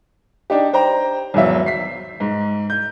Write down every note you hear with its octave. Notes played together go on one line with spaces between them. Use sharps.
D4 D#4 G4
C5 G5 A#5
G#1 E2 F#3 E5
B6 C7
G#2
G6